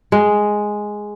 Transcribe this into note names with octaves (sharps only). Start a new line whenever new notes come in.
G#3